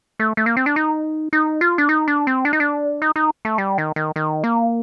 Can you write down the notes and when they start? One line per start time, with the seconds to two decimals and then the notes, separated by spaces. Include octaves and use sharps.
0.20 A3
0.37 A3
0.46 A#3
0.57 C4
0.66 D4
0.76 D#4
1.33 D#4
1.61 F4
1.78 D4
1.89 D#4
2.08 D4
2.27 C4
2.45 D4
2.53 D#4
2.60 D4
3.02 D#4
3.16 D#4
3.45 A3
3.58 G3
3.78 D#3
3.96 D#3
4.16 D#3
4.44 A#3